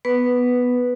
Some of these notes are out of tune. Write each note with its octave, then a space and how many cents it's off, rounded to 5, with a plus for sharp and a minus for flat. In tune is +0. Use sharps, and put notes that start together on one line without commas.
B3 +0 B4 +0